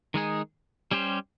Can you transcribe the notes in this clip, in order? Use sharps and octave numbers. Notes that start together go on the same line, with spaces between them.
D#3 G#3 D#4 G#4
G3 C#4 G4 C5